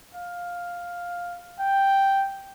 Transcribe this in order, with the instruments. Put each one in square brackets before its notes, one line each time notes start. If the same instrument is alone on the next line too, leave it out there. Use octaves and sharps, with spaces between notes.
[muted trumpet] F5
G5